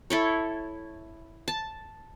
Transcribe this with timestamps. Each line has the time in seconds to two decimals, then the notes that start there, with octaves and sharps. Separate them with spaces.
0.10 E4 A4 C#5
1.48 A5